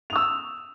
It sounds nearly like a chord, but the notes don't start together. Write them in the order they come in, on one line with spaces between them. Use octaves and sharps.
F7 D#6 E6